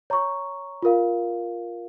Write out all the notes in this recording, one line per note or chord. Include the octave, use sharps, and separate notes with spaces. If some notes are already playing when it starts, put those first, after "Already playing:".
C#5 A#5 C#6
F4 A#4 F5